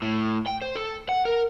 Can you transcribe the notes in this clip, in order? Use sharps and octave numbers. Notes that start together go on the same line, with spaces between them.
A2
G5
C5
A4
F#5
A#4